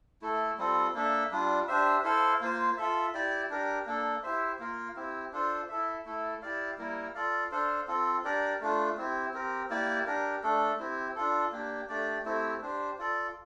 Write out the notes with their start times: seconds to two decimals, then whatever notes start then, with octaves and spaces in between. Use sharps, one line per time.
0.22 A3 E4 A4
0.58 G3 C4 F4 A4
0.95 A#3 D4 A4 E5
1.31 G3 D4 F4
1.68 D4 G4 C5 E5
2.04 E4 A4 C5 F5
2.41 A#3 F4 C5
2.77 F4 A4 E5
3.14 E4 G4 D5
3.50 D4 G4 A#4
3.86 A#3 D4 A4
4.23 E4 G4 C5 E5
4.59 A#3 F4 A#4 F5
4.96 C4 E4 G4
5.32 D4 F4 A4 C5
5.69 E4 A4 E5
6.05 A3 E4 A4
6.42 E4 G4 D5 F5
6.78 G3 A#3 E4 A#4
7.15 F4 A4 D5 F5
7.51 D4 A4 C5 F5
7.87 C4 F4 A4
8.24 D4 G4 A#4 D5
8.61 A3 D4 F4
8.97 C4 E4 G4
9.33 C4 G4 A#4
9.70 A#3 E4 G4 D5
10.06 D4 G4 A#4
10.43 A3 D4 A4
10.79 C4 E4 G4
11.16 D4 F4 A4
11.52 A#3 D4 G4
11.89 A3 D4 G4 D5
12.25 A3 C4 E4 G4
12.62 D4 G4 C5
12.98 F4 A4 D5